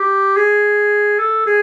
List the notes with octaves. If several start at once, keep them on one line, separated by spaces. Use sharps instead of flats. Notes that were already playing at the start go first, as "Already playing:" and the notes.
Already playing: G4
G#4
A4
G#4